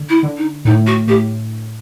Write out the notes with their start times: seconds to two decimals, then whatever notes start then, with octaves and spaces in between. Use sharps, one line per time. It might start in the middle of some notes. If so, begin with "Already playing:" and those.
Already playing: D3
0.09 E4
0.23 D3
0.37 D#4
0.65 A2 D#4
0.86 F#4
1.07 A2 G4